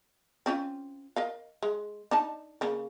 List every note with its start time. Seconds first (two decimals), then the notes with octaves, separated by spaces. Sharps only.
0.46 C4 C#4 F4
1.16 A#4 D#5 F5
1.63 G#3
2.11 D4 D#4 A5
2.61 C#3 A#3